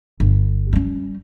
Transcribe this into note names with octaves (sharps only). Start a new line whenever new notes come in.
G1
G3 C#4